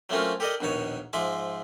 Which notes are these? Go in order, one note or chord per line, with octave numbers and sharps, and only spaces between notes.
F#3 A3 A#3 C4 C#4 F4
G4 A4 A#4 D5 D#5
A#1 D#2 B2 D#4 C#5
G#2 F3 G#3 E5 D6